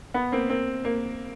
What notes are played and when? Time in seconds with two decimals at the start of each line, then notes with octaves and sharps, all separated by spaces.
0.14 B3
0.32 A#3 C4
0.49 A#3 C4
0.85 A#3